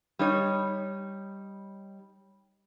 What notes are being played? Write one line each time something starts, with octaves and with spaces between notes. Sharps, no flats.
G3 D#4 C#5